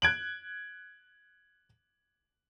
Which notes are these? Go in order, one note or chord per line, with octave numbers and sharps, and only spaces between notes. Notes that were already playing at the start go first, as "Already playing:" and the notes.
F#6 G#6 D7 F#7